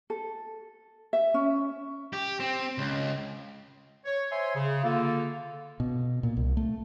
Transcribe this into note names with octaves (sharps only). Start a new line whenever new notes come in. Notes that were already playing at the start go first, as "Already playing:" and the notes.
A4
E5
C#4
G4
C4
C#2
C#5
C5 C#5 E5 G#5 C6
C#3
D3 A#3 F4 A4
B2
A#2
C2
A3